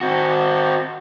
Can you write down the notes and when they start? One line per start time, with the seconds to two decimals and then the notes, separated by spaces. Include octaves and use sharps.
0.01 C4 F#4